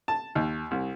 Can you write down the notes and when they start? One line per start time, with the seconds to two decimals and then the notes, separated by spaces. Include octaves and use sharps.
0.08 A5
0.35 D#2
0.71 C2